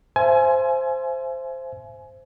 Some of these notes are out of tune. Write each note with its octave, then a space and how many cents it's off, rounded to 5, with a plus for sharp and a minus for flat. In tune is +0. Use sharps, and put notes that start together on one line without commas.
C5 +0 E5 +35 G#5 +25